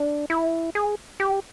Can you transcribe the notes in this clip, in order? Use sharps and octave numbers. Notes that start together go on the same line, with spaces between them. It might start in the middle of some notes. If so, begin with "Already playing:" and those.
Already playing: D4
E4
G#4
G4